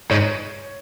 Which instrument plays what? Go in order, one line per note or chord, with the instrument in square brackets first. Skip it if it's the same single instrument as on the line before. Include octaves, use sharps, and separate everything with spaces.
[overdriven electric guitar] G#2 [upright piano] C#5